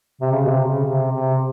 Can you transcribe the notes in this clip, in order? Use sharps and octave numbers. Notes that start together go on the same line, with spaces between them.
C3
C#3
B2
C3
C#3
C3
C3